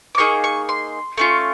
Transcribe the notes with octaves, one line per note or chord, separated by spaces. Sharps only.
D6
A#3 D#4 G#4 C#6
C#6
C6
A3 C#4 F4